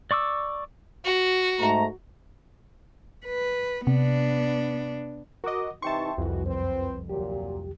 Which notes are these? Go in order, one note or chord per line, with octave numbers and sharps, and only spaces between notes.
D5 C#6 D6 E6
F#4
G#2 A3 A#5
B4
C3 B3 D4
F#4 A#4 D#5 D6
C3 E3 D#4 E5 G5 A5 C6 C#6
C2 F2 E3 F#4
F#2 C4 B4 C5
D2 A#2 F#3 G4